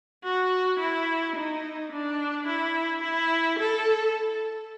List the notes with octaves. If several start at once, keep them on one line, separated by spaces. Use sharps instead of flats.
F#4
E4
D#4
D4
E4
E4
A4